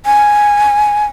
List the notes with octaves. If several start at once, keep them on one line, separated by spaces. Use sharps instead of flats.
G#5